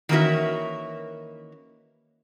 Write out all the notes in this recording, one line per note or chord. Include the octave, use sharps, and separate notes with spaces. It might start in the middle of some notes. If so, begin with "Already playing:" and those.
D#3 E3 A#3 C#4 F#4 E5